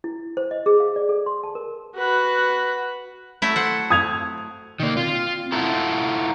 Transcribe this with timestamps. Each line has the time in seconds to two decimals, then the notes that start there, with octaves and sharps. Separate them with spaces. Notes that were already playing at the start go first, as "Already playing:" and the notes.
0.04 E4
0.37 C5
0.51 D#5
0.66 G#4
0.80 F5
0.96 D5
1.09 A4
1.26 C6
1.43 A5
1.55 A#4
1.97 F#4 B4
3.42 F#3 A3 E4
3.56 C5 F#5
3.91 D#6 G#6 F7
4.80 B2 D3 D#3 A#3 D5
4.97 C4 F4
5.52 E4 F4 A4 F#5 A#5